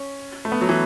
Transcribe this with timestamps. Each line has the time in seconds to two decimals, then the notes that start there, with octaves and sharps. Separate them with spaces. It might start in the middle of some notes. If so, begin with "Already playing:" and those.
Already playing: C#4
0.45 A3
0.52 B3
0.61 F#3
0.69 E3